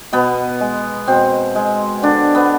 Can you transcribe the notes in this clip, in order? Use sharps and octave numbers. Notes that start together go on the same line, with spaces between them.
B2 B3
G#3
B2 C4
G#3
D3 D4
B3